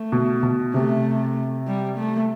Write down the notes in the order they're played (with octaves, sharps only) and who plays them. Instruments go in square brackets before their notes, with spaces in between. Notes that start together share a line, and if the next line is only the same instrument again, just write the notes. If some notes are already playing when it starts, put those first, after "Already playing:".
Already playing: [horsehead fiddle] A3
[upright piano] B2
B2
[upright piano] C3 [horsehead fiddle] A3
[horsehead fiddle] G3
A3